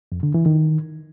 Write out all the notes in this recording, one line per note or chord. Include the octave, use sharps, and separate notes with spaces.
F2
D3
E3
D#3